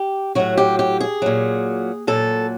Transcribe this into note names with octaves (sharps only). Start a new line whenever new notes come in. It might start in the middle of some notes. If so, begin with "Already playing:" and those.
Already playing: G4
A2 F#3 F#4
G4
G4
G#4
A#2 F#3
A#2 F#3 A4